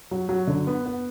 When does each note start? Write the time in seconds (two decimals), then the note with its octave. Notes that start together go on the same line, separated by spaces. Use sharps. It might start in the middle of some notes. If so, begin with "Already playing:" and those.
0.11 F#3
0.29 F#3
0.47 D3
0.67 B3
0.86 B3